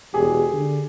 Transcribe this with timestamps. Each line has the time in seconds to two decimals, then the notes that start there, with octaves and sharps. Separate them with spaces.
0.14 E1 G4 G#4
0.53 D3